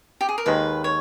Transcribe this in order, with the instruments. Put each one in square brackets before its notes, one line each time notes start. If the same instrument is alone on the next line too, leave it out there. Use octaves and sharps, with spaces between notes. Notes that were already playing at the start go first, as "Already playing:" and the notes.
[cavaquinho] G4
G#4
A#4
[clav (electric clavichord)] D#2 D#3 G#3 [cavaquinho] B4
[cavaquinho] C#5